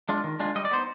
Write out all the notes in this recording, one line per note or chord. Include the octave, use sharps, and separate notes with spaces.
G#3 D4 F4
D#3
G#3 D4 F4
G3 D#5
D5
B3 D#4 C5